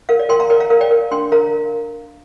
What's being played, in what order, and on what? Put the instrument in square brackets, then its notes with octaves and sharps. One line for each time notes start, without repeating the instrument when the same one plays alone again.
[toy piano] A#4 F5
D5
A#4 G5 C6
F5 A#5
A#4 D5 G5
F5 A#5
A#4 F5
D5 G5
A#4
D4 G5 C6
A#4 F5 A#5